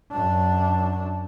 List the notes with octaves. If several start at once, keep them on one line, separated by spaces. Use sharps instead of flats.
F#2 D4